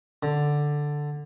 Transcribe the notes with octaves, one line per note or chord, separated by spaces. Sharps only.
D3